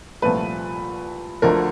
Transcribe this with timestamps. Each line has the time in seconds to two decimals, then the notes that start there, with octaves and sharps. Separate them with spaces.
0.22 C2 A#2 F3 A3 B4
1.42 D2 D3 F3 A3 A#4